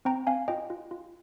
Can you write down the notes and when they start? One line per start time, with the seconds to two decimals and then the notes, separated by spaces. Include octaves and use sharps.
0.05 C4 G5 A#5
0.27 C4 F5 G#5
0.48 F4 D#5 G5
0.70 F4
0.91 F4